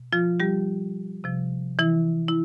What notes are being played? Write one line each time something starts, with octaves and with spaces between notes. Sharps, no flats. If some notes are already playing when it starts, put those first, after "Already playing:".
Already playing: B2
F3 F4
G3 G4
C3 F3
E3 E4
E4